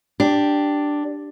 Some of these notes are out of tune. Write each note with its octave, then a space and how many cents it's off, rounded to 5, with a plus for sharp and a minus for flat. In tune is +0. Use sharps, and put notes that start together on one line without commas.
D4 +0 G4 +0